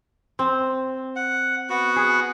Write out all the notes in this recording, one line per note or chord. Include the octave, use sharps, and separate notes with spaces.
C4
F#5
B3 F#4 F#5
G#4